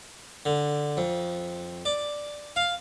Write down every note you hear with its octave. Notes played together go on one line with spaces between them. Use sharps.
D3
F2
D5
F5